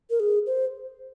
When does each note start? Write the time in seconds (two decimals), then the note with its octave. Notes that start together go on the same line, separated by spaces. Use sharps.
0.10 A#4
0.20 G#4
0.46 C5